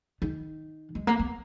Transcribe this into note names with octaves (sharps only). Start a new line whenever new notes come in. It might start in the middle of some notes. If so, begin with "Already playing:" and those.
D#3
G#3
A#3
B3